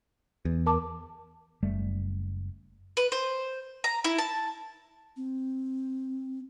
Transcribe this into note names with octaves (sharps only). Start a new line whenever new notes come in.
E2
A#4 A5 D6
F#1 G3 A3
B4
C5
A#5
E4
A5
C4